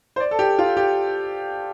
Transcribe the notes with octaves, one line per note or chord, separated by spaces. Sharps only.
C5
D5
A4
G4
F4
G4